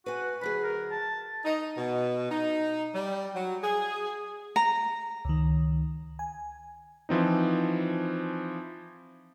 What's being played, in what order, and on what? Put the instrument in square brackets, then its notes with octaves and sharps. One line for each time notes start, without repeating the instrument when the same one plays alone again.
[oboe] F#4 [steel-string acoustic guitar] B4 G#5
[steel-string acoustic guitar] D2 F#3 G#4 [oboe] B4
[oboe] A#4
A5
[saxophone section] D#4
B2
D#4
G3
F#3
G#4
[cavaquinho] A#5
[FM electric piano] C#2 D#3
G#5
[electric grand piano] E3 F3 C4 D#4